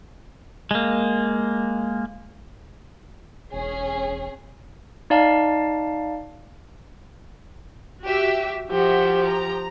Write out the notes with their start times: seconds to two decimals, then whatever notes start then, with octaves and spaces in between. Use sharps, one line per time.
0.71 G#3 A#3
3.53 E1 C#4 G#4
5.10 D#4 D5 F5 A5
8.03 F#4 G4 E5
8.71 F3 F#4 G4 E5
9.24 A#5